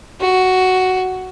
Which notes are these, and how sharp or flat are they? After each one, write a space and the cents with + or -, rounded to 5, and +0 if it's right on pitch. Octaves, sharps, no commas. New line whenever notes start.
F#4 +5